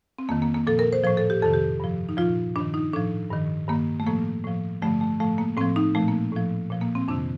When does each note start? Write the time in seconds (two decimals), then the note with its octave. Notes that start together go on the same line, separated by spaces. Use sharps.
0.19 C4
0.29 F2 D#3 A#3
0.42 A#3
0.54 A#3
0.67 A#2 F3 A4
0.79 A#4
0.93 C5
1.04 A2 F3 C5
1.17 A4
1.30 G4
1.42 F2 C3 D#3 A4
1.53 G4
1.80 G2 F3
2.09 D#4
2.17 A#2 F3 F4
2.56 G2 D#3 D4
2.74 D#4
2.93 A2 F3 D4
3.31 G2 D#3
3.68 G2 D#3 A#3
4.00 A3
4.07 A2 F3 A#3
4.44 A2 F3
4.82 G2 D3 F3 A3
5.01 A3
5.20 A2 F3 A3
5.38 A#3
5.57 A2 F3 C4
5.76 D#4
5.95 A#2 F3 A3
6.08 A#3
6.32 A2 F3
6.70 A#2 F3
6.81 A#3
6.95 C4
7.08 F2 C3 D#3 D4